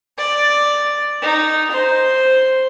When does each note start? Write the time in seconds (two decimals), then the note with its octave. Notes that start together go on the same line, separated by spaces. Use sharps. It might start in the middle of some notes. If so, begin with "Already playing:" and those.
0.18 D5
1.22 D#4
1.71 C5